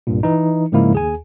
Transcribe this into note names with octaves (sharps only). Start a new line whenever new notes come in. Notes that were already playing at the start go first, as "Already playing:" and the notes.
C2 G2 A#2
E3 D#4
G#2 C#3 F3 G#3 A#3 E4
D#2 G#4 G#5